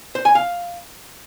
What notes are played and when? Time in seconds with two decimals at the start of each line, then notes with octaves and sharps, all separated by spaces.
0.15 C5
0.25 G#5
0.35 F5